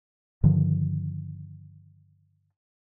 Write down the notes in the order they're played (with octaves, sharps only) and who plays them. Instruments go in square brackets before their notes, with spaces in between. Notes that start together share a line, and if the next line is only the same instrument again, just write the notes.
[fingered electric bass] G2 D3 D#3 F3